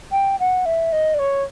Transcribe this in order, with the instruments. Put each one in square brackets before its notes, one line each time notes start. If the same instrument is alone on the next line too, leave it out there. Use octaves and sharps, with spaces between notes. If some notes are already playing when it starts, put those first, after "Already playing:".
[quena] G5
F#5
E5
D#5
D5
C#5